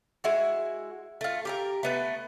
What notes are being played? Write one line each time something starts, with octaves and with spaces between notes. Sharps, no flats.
G#3 E4 F#4
A3 F4
G4 A#4 A#5
A3 B3 B4